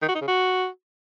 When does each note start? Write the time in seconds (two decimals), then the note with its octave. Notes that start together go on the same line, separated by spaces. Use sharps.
0.02 D#3
0.08 F#4
0.15 D#4
0.21 C#3
0.28 F#4